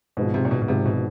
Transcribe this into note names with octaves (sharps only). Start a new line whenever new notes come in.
G#1 G#2 B2 F3 G#3
C3
A#2
B2
B2
G#1 G#2 C3 F3 G#3
B2